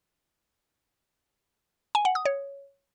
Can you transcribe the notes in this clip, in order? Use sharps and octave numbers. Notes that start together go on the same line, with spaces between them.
G#5
F#5
D#6
C#5